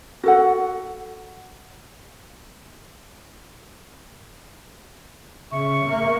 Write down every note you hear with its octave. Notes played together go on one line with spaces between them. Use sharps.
F#4 A4 F#5
C#3 E5 C#6
A#3